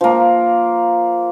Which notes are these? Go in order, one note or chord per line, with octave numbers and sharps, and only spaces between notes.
F3 A#3